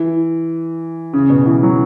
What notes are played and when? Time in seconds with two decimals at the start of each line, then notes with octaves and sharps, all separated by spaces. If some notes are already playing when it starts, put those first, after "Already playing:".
Already playing: E3
1.13 C#3
1.30 B2
1.46 E3
1.63 F#3